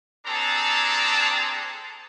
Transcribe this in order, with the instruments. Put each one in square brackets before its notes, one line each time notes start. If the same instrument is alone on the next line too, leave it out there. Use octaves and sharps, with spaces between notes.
[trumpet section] C4 D4 G#4 A4 A5 A#5